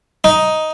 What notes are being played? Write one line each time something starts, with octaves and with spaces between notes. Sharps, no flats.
D#4